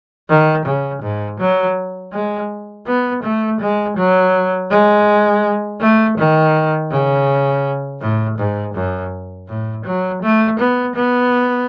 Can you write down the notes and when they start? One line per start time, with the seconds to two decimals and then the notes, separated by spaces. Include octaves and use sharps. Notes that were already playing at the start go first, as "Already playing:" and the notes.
0.29 D#3
0.66 C#3
1.02 G#2
1.40 F#3
2.13 G#3
2.87 B3
3.23 A3
3.60 G#3
3.97 F#3
4.70 G#3
5.80 A3
6.18 D#3
6.91 C#3
8.01 A2
8.38 G#2
8.75 F#2
9.49 A2
9.85 F#3
10.22 A3
10.59 B3
10.95 B3